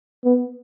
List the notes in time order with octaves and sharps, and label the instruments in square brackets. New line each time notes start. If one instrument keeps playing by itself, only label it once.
[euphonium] B3